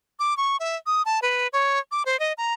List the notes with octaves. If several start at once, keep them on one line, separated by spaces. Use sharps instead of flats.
D6
C#6
E5
D#6
A5
B4
C#5
D6
C5
D#5
A#5